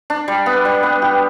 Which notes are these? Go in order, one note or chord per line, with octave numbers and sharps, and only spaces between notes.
D4
G3
B3
G3
B3
G4